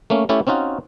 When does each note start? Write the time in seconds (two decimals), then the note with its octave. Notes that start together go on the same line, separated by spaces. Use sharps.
0.10 A3 A#3 C#4
0.29 A3 C#4 E4 G4 A4
0.47 C4 C#4 D#4 F4 F#4